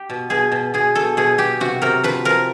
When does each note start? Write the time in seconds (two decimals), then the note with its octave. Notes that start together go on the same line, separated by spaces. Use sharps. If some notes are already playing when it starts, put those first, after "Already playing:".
Already playing: G4
0.10 B2
0.30 B2 G#4
0.52 B2
0.74 B2 G#4
0.95 B2 A4
1.17 B2 G#4
1.38 B2 G4
1.60 C3 F#4
1.82 C3 A#4
2.03 F3 B4
2.25 F3 A#4